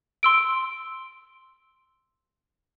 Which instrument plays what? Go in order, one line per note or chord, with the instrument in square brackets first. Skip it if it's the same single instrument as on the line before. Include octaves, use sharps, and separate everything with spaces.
[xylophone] C6 E6 D7